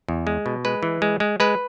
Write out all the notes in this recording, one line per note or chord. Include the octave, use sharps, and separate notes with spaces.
E2
G#3
B2
G#3 B4
E3
G#3
G#3
G#3 B4